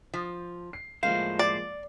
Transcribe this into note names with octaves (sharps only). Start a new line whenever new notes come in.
F3
C7
A2 F3 G#3 A#3 C5 F5
D5